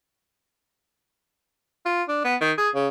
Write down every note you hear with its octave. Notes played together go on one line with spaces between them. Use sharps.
F4
D4
B3
D#3
G#4
C#3